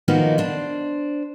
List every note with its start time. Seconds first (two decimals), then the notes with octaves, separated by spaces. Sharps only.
0.08 D#3 F3 A#3 B3 D#4 F#4
0.38 D4 C5